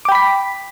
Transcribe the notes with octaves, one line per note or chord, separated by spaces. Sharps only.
G5 B5 D6 B6